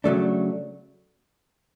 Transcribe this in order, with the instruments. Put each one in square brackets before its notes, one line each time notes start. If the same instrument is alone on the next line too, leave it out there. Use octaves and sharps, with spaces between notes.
[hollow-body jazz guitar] C#3 F#3 A3 D4